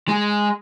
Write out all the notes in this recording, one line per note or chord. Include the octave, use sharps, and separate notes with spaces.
G#3